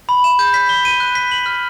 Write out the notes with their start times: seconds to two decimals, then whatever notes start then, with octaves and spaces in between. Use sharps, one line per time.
0.09 B5
0.24 E7
0.39 G6
0.54 B6
0.69 G7
0.85 D#7
1.00 F#6
1.15 B6
1.31 F#7
1.46 F6